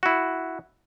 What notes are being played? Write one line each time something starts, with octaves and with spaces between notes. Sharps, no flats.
E4 F#4